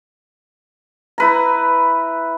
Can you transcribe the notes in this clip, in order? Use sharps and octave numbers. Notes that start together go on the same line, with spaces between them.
E4 B4 A#5